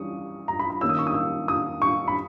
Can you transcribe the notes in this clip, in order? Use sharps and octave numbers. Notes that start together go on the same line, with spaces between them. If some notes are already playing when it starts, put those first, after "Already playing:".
Already playing: E3 G3 C#4 C#6 D#6
A#5
B5
B5
D#3 A#3 C#4 E6
D#6
C#6
D#6
E6
D#6
C#6
B5